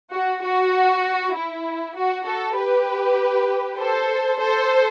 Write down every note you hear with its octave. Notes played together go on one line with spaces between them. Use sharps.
F#4
F#4
E4
F#4
F#4 A4
G4 B4
A4 C5
A4 C5